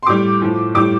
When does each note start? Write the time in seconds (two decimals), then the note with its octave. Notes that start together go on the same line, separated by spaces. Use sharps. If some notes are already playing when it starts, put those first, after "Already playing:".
0.03 C6
0.06 A2 G3 D6
0.42 A2 F3
0.75 A2 G3 D6